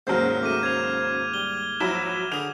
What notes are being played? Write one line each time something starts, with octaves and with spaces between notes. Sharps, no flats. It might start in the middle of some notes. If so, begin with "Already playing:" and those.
D#2 G#2 C#3 F#3 C5 F6 G6
A3 D6 D#7
C5 G#6 F7
G3 G7
F3 F#3 E4 E7
D3 G#4 F7